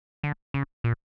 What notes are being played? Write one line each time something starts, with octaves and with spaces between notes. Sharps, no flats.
D3
C#3
A#2